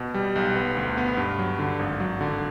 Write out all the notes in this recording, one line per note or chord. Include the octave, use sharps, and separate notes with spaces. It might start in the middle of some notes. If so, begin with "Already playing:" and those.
Already playing: B2
G3
B1
B3
D2
B3
G2
F#3
D3
G#1
F#3
D3